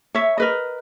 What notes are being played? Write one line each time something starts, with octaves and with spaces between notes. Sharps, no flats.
C#5 E5
A#4 B4 D#5